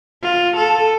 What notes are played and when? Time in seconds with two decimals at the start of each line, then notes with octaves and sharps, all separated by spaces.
0.22 F4
0.56 A4